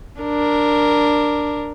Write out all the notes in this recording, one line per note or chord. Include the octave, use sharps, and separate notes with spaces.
D4 A#4